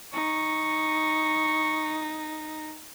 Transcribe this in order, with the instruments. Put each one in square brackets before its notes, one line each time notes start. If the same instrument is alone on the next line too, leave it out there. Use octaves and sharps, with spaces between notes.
[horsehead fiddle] D#4 [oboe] C#6